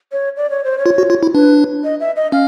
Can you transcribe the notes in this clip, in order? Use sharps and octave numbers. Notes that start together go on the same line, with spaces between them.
C#5
D5
C#5
C5
C#5
F4
F#4
F4
E4
D4 B4
D#5
E5
D#5
C#4 F5